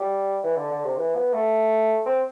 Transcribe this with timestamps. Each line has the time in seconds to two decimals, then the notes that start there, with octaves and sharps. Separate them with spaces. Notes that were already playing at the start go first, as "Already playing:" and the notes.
Already playing: G3
0.43 E3
0.56 D3
0.71 D3
0.84 C3
0.97 E3
1.15 B3
1.33 A3
2.06 C4